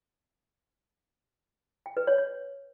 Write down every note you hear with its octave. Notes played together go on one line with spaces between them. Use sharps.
G5
B4
C#5
C#5